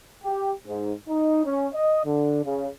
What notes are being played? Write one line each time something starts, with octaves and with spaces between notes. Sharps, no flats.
G4
G#2
D#4
C#4
D#5
D3
C#3